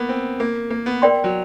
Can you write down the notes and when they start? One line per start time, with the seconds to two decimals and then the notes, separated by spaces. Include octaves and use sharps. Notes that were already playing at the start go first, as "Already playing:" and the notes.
Already playing: A#3 B3
0.09 C4
0.40 A#3
0.70 A#3
0.86 B3
1.02 A#4 D5 G5 C6
1.24 F#3